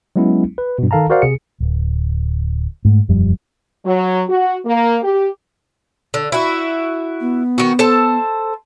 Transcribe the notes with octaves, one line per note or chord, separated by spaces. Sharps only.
F#3 G#3 B3 C#4 E4
B4
G2 B2
D#3 A4 F5 A5 A#5
F#4 A#4 C5 D5 F5 F#5
C3 G#4 C#7
D1
G#2 A3
E1 F#2 F3 G3
F#3
F#4
A#3
G4
D3
E4 F#4
B3
D#3 F#4
A4 C5 A5